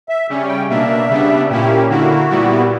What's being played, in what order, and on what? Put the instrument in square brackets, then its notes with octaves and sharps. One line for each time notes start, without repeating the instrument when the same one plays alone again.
[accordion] E5
[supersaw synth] C#3 G3 C#4
[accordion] G5
[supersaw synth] B2 A#3 D4 [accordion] E5
[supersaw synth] C#3 G3 B3 D4
[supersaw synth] A#2 A#3 C#4 E4 [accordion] G4
[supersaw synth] D3 A#3 E4 [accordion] F#4
[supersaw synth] A#2 G3 B3 E4